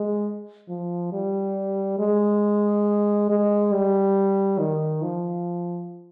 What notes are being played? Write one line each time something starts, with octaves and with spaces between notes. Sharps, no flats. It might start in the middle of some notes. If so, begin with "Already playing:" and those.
Already playing: G#3
F3
G3
G#3
G#3
G3
D#3
F3